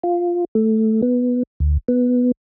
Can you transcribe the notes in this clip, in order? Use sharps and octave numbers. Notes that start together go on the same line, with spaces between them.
F4
A3
B3
D2
B3